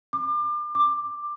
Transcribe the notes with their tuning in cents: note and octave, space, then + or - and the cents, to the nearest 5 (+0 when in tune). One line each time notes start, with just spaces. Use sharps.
D6 +35
D6 +15